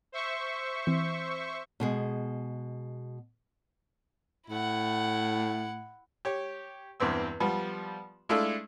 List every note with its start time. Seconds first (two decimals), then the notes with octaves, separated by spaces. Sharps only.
0.12 C5 E5 C#6
0.87 E3 C4
1.80 B2 G#3 G#4
4.50 A2 E4 F#5
6.25 G4 C#5
7.00 E2 G2 C4 E6
7.40 F3 G3 B3
8.29 G#3 A3 D4 E4 F4 A4